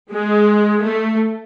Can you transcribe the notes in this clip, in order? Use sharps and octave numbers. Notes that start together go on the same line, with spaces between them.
G#3
A3